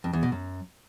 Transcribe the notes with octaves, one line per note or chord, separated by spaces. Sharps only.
F2
E2
B2
F#2